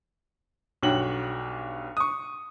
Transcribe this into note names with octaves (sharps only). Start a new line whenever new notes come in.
B1 G2 F#4 C#5 G5 F#7
C#6 D#6